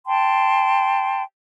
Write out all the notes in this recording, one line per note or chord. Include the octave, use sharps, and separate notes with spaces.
G5 A5 C6